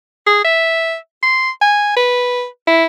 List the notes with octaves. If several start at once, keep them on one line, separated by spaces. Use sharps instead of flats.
G#4
E5
C6
G#5
B4
E4